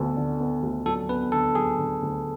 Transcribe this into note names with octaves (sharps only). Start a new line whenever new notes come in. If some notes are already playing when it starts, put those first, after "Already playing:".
Already playing: D2 D3 B3 A4
D3
B3
D2
F#3 A4
B3 B4
D3 A4
F#3 G#4
D3
D2